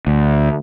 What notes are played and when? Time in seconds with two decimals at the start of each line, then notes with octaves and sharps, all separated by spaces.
0.07 D2